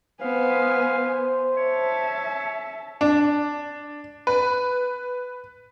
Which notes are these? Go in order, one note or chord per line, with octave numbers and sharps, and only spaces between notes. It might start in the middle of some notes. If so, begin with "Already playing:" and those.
B3 C5 F5 G#5
C#5 E5 A5
D4
B4